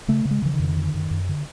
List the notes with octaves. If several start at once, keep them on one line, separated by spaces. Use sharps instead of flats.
C#3 A3
C#3
G#3
C#3 E3
D#3
F2
D3
F#2
F#2
D3